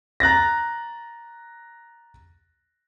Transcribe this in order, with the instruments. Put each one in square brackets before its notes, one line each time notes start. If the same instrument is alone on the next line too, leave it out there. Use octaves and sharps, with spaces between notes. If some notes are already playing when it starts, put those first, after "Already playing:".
[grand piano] A#5 F#6 A6 A#6